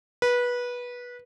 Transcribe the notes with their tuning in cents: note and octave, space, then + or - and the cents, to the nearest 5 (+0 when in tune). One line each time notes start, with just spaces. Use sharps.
B4 -20